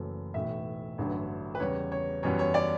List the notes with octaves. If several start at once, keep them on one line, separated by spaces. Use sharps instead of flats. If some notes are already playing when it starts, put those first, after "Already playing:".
Already playing: F#1 F#2 E3 A3
B1 A2 E3 E5
A1 G2 D3 F#3
B4
E2 C#3 G3 C#5
C#5
F#2 E3 G3 B3 C#5
C#5
D5